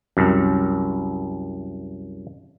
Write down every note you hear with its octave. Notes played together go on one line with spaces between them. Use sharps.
C2 F#2